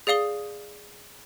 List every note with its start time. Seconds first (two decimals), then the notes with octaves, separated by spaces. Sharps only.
0.07 G#4 D5 F5 D#6 G7